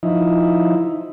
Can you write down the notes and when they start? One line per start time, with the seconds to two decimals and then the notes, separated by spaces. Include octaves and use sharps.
0.03 F3 D#4 E4